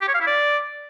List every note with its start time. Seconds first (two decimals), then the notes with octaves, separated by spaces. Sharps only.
0.01 G4
0.08 C#5
0.14 F5
0.21 E4
0.27 D5